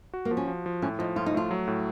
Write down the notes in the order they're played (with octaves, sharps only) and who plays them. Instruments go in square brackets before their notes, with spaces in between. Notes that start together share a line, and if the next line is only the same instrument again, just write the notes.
[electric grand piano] F#4
[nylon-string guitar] A#3
[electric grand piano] F3
[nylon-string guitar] C#4
[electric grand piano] F3
F3
[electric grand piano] A2 [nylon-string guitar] C#4
[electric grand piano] F3 [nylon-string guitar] D#4
[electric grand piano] A2 [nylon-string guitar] F4
[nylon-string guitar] D#4
[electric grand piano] A3 [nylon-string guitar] F4
[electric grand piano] F#3
A2